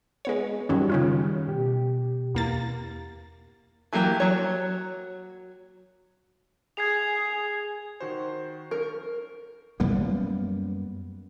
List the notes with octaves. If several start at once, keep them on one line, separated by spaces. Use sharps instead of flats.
G#3 B3 C#5
F#2 D#3 F#3 G3 C#4
C#3 C#4 F4
B2 G4
E2 A#3 A6
E3 F#3 A#3 G4 G5
F#3 C#5
G#4 G#6 C7 F7
D#3 F#4 C5
A#4 C#6
F#2 G3 A#3 B3